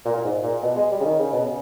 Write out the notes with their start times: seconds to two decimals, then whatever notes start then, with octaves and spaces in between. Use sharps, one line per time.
0.05 A#2
0.15 A#2
0.24 G#2
0.43 A#2
0.63 B2
0.76 G#3
0.91 G3
1.00 C#3
1.05 D#3
1.19 C#3
1.33 B2
1.45 C#3